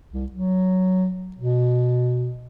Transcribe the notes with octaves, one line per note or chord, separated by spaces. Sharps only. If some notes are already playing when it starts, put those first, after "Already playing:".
C2
F#3
B2